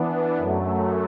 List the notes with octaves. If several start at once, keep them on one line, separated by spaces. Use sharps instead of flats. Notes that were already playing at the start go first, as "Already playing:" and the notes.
Already playing: E3 B3 D4
F#2 F#3 A3